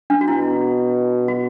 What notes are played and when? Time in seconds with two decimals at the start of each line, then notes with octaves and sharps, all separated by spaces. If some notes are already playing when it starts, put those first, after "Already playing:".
0.10 D4
0.21 F#4
0.28 B2 E4
1.28 F#4